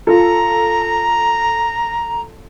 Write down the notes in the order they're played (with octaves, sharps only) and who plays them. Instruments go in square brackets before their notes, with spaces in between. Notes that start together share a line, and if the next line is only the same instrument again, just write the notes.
[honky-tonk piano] F4 A4 [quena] A#5